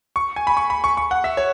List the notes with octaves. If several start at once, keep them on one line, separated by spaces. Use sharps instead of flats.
C#6
G#5
B5
C#6
B5
C#6
C#6
F#5
E5
C#5